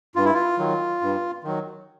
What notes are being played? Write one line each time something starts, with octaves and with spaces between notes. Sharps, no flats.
G2 F4
E4
F4
D#3 F#3
G2
D#3 F#3